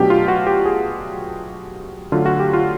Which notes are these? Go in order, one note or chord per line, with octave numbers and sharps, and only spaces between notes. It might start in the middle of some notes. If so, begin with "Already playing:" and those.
Already playing: B2 F#3 A3 D4 G4
F4
F#4
G4
G#4
D3 F#3 A3 F4
F#4
G4
F4